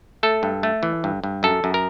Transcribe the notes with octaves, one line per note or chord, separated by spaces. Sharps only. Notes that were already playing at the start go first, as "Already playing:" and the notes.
A3 A4
G2
A3
E3
G2
G2
F#2 A4
F#2
A#4